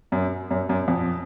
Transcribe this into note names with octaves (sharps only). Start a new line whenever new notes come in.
F#2
F#2
F#2
F2